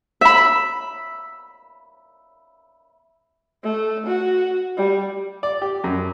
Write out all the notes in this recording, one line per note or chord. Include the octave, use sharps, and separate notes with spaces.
E5 B5
A3
F#4
G3
D5
G4
F#2